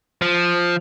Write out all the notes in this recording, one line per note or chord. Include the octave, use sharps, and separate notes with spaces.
F3